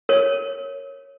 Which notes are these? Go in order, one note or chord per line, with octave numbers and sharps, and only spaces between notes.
A#4 C#5